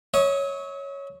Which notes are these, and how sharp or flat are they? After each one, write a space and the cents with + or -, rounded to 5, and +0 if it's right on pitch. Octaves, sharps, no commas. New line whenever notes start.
C#5 +0 E5 -45 D#6 +0